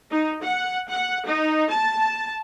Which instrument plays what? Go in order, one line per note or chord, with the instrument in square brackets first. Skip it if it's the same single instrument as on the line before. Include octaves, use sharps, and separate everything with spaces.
[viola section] D#4
F#5
F#5
D#4
A5